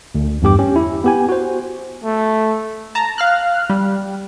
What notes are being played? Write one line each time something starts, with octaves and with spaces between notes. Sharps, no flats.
D2
E2 G2 G4 D6
C#4 G4
E4
B3 G4 G#5
F#4 C5
A3
A5 A#5
F5 F6 F#6
G3